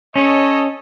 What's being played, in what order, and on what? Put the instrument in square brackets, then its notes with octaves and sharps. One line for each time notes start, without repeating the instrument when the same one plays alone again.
[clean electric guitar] C#4 [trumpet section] A4 C#5 D#5